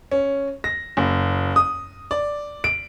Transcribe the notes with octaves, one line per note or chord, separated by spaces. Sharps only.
C#4
A#6
F#1
D#6
D5
D7